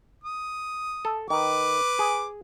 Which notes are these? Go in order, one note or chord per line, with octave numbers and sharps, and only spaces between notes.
D#6
A4
D#3 B4 D6
G#4